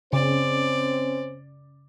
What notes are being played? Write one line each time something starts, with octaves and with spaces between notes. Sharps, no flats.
C#3 C4 C#4 C5 D5